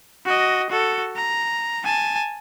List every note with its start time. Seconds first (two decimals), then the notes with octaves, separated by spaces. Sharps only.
0.25 F#4 D#5
0.70 F#4 A4
1.16 A#5
1.85 G#5 A5